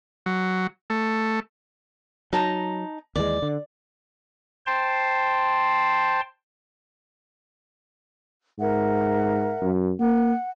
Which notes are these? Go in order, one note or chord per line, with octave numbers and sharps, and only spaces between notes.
F#3
A3
F#3 D#4 A5 A#5
D#2 E3 G#3 D5
D3
C5 G5 A5 C6
G#2 A#4 E5 F#5
F#2
A#3 F#5